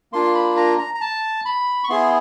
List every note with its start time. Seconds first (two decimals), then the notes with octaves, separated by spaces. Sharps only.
0.12 A#3 D4 F4 C6
0.35 B5
0.57 A#5
0.78 A#5
0.95 A#5
1.01 A5
1.45 B5
1.84 C#6
1.89 B3 E4 G#4 C6